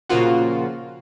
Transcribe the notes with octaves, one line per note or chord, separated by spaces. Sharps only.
A#2 C#3 F3 A#3 F4 F#4